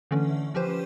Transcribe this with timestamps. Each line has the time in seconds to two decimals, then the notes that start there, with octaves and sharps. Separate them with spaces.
0.11 D3 E3 A3 C#4
0.54 F3 C#4 G4 B4 C5